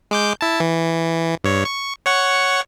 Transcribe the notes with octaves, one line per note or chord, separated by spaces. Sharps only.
G#3 D6 G6
E4 A5
E3
G2 C#5
C#6
C#5 F#5 C#6